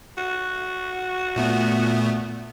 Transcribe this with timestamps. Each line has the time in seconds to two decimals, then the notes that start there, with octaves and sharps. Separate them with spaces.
0.17 F#4
1.36 A#2 A3 B3